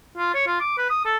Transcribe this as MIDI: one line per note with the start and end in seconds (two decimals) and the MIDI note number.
0.17 0.33 65
0.34 0.43 73
0.47 0.58 65
0.60 0.76 86
0.78 0.89 71
0.90 1.00 87
1.05 1.17 69